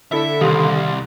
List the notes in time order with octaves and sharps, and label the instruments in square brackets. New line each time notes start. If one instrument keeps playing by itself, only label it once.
[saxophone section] D3 [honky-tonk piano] E4 A4 [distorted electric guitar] E5
[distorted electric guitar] C2 [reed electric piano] D#3 G4 D#6 [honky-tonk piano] F5 C6